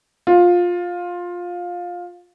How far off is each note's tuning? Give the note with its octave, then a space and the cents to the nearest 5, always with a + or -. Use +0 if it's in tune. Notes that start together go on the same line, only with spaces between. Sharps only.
F4 +15